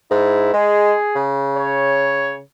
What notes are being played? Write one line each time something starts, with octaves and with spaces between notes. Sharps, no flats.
G#2 E4
G#3 G#4
C#3
C#5